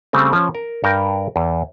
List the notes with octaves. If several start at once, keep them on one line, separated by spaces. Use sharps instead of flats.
C#3 G3 A3 C4
F3 C#4
A#4
G2 A#4 G5
E2